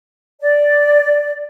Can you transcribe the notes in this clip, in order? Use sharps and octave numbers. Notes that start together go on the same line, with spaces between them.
D5